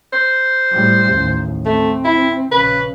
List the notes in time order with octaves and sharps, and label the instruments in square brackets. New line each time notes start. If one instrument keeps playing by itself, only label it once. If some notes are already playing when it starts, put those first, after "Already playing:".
[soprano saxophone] C5
[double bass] A2 G3
A1 D#2
[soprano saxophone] A3 [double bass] C4
[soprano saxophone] E4
[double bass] A#1 C#3 [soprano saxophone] B4